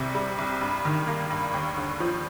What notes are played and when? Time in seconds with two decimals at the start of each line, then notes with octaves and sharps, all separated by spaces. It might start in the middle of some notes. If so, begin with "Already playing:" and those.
Already playing: C2 C3 G3
0.15 G3
0.38 C2
0.61 G2
0.85 D#3
1.07 A#3
1.30 G2
1.54 D#2
1.77 D3
2.00 F3